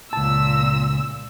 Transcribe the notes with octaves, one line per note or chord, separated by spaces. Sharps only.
C#2 A#2 A5 E6